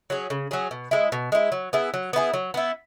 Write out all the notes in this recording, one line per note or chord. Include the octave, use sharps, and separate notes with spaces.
F#3 C#4 G#4
C#3
F#3 C#4 G#4
B2
G#3 E4
B2
G#3 E4
F#3
B3 E4 G#4
F#3
B3 E4 G#4
F#3
B3 E4